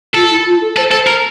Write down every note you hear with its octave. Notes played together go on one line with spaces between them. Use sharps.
F4 A4
E4
F4
A4
A4 C5
A4
C5
A#4